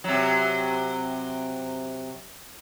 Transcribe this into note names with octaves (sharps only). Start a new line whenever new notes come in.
C3 F#3